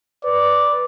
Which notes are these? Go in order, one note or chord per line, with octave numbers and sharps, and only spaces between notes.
B4 D5